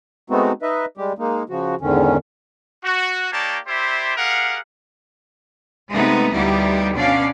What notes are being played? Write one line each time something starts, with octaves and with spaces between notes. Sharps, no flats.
G#3 A3 B3 C4 D#4 F#4
D#4 B4 D#5 E5
G3 G#3 G4
G#3 A#3 D#4
C#3 F3 F#4
E2 G#2 D3 D#3 C#4
F#4
A#3 D#4 G4 C#5 D5 A5
E4 G4 C5 D5 E5 C6
G4 G#4 A#4 F5 F#5
C3 G#3 A3 B3 D#4 B4
D2 G3 B3 D#4 E4 G4
B2 C#4 D4 D5 F5